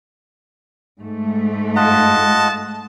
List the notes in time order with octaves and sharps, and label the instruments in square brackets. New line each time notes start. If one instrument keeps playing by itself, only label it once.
[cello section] G#2 A3
[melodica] F4 D#5 F#5 [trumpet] A5